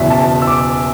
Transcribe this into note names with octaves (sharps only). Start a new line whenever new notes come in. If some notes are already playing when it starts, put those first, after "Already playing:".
Already playing: F#1 E2 B2 E5
A5
E6
D6